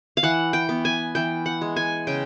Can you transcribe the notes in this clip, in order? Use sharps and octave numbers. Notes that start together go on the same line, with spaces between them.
F5
E3 F#5
G5
B3
G#5
E3 G5
F#5
G#3
G#5
C#3 G5